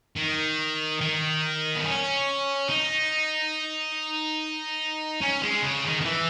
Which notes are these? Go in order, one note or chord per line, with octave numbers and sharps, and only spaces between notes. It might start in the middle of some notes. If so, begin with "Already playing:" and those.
D#3
D#3
B3
C#4
D#4
C#4
G#3
C#3
D#3
D#3
E3